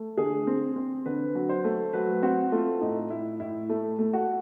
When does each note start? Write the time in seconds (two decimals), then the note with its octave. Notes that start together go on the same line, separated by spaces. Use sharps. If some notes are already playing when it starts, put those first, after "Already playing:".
Already playing: A3
0.17 D3 G#4
0.47 C4
0.76 C4
1.06 D3 B4
1.35 F#3
1.49 C5
1.64 A3
1.93 F#3 B4
2.23 C4 F#4
2.52 A3 F4
2.81 A2 D#4
3.10 A2 E4
3.40 A2 E4
3.69 A3
3.99 A3
4.13 F#4